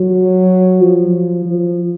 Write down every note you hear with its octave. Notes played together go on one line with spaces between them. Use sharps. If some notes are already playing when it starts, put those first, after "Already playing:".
Already playing: F#3
F3
F3